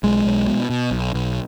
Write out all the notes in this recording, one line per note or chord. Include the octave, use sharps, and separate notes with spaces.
B1 G#3
B1
B2
B2
B1
B1